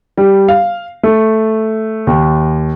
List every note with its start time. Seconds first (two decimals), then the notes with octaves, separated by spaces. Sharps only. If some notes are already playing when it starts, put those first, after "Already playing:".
0.17 G3
0.48 F5
1.03 A3
2.07 D#2